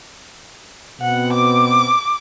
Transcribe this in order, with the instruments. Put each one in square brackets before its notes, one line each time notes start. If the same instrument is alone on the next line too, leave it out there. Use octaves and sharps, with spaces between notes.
[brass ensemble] B2 B3 C4 [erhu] F#5
[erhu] D6